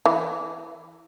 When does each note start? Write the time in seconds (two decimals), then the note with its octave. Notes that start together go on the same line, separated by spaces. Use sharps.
0.06 E3